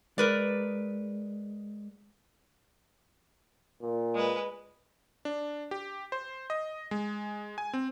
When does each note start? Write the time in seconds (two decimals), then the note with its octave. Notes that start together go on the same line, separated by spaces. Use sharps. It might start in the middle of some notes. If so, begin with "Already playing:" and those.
0.18 G#3 A#4 B4 D5
3.81 A#2
4.15 G#3 B4
5.25 D4
5.71 G4
6.12 C5
6.50 D#5
6.91 G#3
7.58 G#5
7.73 C4